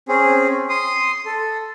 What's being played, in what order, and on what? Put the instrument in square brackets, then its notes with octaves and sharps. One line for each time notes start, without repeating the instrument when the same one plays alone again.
[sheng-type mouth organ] C4 C#4 G#4
C6 D#6
A4